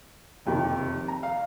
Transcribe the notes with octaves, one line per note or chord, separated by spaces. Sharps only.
F#1 F2 C3 D#3
A#5
F5